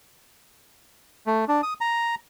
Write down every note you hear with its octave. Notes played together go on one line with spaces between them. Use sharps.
A3
D4
D#6
A#5